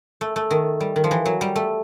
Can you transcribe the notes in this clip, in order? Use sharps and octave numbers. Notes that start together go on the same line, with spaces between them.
A3
A3
D#3
G3
D#3
F3
E3
F#3
G3
A3